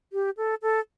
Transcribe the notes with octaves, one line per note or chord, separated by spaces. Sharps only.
G4
A4
A4